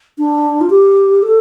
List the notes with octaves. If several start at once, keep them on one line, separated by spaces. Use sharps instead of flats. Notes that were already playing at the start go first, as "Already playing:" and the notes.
D4
F4
G4
A4